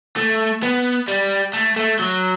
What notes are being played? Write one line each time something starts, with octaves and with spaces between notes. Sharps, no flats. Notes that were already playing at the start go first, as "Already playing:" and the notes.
A3
B3
G3
A3
A3
F#3